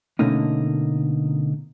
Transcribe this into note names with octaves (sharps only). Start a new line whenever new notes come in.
B2 D3 A3 A#3 C#4 D#4